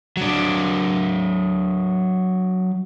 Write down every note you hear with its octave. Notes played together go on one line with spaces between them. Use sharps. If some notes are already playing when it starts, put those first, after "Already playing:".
F#3 D4